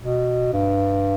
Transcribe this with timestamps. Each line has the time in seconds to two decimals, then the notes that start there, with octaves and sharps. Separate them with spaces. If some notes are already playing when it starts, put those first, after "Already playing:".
0.02 B2
0.53 G2